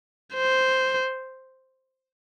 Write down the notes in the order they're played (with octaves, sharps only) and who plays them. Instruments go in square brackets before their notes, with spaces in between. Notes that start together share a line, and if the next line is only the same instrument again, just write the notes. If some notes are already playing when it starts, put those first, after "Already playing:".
[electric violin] C5